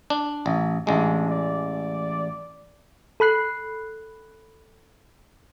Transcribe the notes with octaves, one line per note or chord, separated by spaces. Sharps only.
D4
A1
A1 G#3 D4
D5
A4 B5 F#6 C7